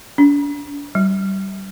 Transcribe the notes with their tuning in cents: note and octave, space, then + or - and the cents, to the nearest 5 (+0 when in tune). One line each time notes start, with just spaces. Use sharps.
D4 -35
G3 -25